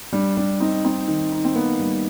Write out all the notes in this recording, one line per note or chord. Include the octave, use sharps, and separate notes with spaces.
G3 D4
G3 D4
C4 D#4
C4 D#4
D#3
D#4
C4
A#3 B3
G3